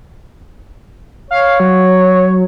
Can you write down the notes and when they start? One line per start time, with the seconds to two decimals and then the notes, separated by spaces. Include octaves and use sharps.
1.31 C#5 F5
1.60 F#3